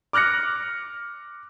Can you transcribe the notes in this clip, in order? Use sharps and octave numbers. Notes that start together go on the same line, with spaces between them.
D6 F6 F#6 A#6 C#7